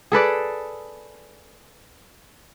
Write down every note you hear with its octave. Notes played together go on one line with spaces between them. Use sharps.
G#4 A4 B4 D5